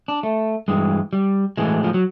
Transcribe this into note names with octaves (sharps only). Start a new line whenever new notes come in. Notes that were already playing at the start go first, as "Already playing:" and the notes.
D4
A3
G2 E3 G#3
G3
A2 E3 G#3
F3
F#3